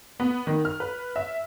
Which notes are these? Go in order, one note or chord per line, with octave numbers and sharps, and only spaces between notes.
B3
D#3
F6
B4
E5